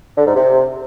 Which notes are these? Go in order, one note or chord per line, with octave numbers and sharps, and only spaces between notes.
D3
G#2
C3